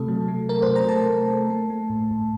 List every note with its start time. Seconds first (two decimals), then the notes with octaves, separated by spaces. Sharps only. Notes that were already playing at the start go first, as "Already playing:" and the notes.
Already playing: C3 A3 A4
0.08 F#3
0.28 A3
0.49 F#3 A#4
0.62 C5
0.68 C3
0.76 A#5
0.89 A3 A5
1.09 A3
1.30 A3
1.50 A3
1.70 A3
1.90 A2
2.11 A2